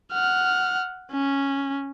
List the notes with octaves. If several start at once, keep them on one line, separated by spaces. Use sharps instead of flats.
F#5 F6
C#4